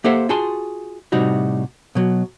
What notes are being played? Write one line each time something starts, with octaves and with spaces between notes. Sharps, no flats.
A#3 G4 A4 C5 E5 F#5
F4 F#4 G#4 A5 C6
A2 C3 G3 D#4 F#4
B2 F#3